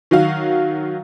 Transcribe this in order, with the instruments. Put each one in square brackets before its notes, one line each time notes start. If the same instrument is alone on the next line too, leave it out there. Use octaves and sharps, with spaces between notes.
[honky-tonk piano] D#3 F#3 F#4 F5